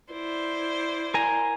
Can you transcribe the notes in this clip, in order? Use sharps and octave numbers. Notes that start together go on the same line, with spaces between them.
E4 C5 D5
A#4 G#5 A#5